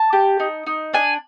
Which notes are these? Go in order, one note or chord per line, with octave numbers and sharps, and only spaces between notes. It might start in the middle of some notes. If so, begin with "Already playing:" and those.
Already playing: A5
G4
D#4
D#4
D4 G#5